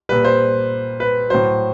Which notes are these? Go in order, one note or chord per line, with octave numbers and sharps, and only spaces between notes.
A#2 G3 B4
C5
B4
A2 F#3 C5